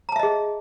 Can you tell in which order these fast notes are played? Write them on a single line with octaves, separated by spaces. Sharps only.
A#5 A5 E5 D#5 G#4